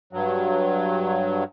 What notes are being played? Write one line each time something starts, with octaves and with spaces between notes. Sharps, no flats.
G2 F#3